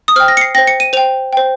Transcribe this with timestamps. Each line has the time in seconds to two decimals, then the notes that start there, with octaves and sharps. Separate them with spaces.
0.08 D#6
0.16 C5 G5 F6
0.28 A#6
0.37 C#7
0.41 C7
0.55 C5 G5 A#6
0.67 C#7
0.80 D#7
0.93 C5 G5 F7
1.33 C5 G5